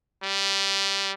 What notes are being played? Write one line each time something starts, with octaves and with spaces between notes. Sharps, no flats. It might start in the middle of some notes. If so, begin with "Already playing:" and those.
G3